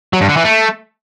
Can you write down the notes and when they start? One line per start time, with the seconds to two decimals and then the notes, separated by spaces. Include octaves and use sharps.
0.13 F#3
0.21 G2
0.29 D3
0.37 E3
0.44 A3